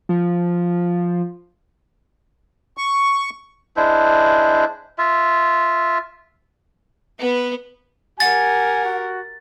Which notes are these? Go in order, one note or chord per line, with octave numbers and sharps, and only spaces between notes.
F3
C#6
G#3 D4 E4 C5
F4 E5
B3
G4 A#4 F#5 G#5 A6
F#4